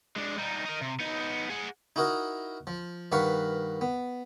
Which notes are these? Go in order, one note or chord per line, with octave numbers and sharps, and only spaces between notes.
G#3 D4
G3 D#4
D#4 A#4
C3
B3 D#4
G#4 F#5
D#4 E4 F#4 A#4 D#5
F3
G2 D#3 B4 F5 F#5 C#6
B3